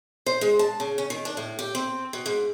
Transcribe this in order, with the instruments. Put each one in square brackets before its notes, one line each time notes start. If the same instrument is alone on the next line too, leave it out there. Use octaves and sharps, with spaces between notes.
[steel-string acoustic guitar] C5
G#3
A5
C#3
C#4
D#3
D4
A2
G4
C4
B2
G#2